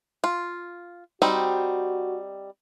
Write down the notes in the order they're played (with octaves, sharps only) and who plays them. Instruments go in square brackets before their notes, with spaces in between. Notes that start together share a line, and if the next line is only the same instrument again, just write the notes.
[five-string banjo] F4
[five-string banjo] G3 C4 D#4 [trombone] F#4